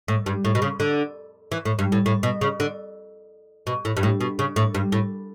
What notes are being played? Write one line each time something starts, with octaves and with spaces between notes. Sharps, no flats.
A2
G2
A2
B2
C#3
D3
E3
A2
G2
A2
A2
B2
C#3
D3
B2
A2
G2
A2
B2
C#3
A2
G2
A2